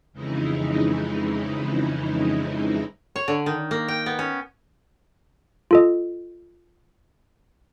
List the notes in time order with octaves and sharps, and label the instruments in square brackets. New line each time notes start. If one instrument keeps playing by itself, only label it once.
[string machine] F2 C#3 E3 G#3 D#4 E4
[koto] C#5
D3
D#3
A#3
G5
B3
C#4
[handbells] F4 A4 D#5